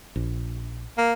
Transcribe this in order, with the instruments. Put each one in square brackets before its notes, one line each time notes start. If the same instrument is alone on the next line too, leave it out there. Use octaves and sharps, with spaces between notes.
[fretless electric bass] A#1
[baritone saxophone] A#3